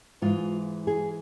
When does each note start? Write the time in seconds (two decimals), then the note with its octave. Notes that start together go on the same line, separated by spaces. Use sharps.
0.22 G#2 E3 G#3 F4
0.87 G#4